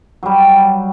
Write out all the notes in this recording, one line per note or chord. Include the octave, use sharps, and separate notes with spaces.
F#3 G3